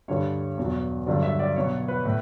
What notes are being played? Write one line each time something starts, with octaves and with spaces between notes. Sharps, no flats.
G2 D3 G3 C#5
E2 B2 F#3
G2 D3 F#3 D5
E5
D5
B2 F#3 C#5
B4
A2